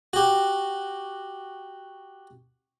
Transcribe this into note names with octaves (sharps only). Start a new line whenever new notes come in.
F#4 G4